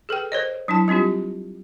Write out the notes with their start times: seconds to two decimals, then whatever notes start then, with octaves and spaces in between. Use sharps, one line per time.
0.09 G#4 A4 B4 G5
0.32 A#4 C5 C#5 D#5
0.68 F#3 D4 E4 A5
0.88 G3 C4 D4 F4 G4